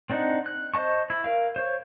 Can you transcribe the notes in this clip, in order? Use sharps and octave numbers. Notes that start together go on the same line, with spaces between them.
C4 D4 D#4 F#5
F#6
C5 D#5 A5 C#6
E4
A#4 F5
C5 C#5